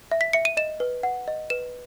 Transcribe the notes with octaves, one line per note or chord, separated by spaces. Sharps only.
E5
B6
E5 C#7
D#7
D#5 E7
B4
F#5
D#5
B4 E7